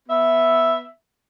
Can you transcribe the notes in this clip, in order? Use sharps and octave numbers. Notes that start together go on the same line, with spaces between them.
B3 E5